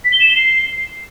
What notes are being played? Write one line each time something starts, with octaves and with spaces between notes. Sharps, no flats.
B6
G7
E7
G7
C7